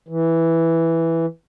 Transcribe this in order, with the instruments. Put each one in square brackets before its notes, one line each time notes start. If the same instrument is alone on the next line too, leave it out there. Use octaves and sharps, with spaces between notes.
[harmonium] E3